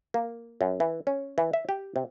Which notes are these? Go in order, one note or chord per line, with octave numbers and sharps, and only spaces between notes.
A#3
F#2
E3
C#4
E3
E5
G4
C3